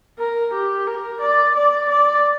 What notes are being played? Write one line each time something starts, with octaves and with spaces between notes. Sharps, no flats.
A#4
G4
A#4
D5
D5
D5